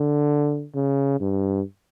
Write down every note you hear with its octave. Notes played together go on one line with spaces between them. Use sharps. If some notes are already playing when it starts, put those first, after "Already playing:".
Already playing: D3
C#3
G2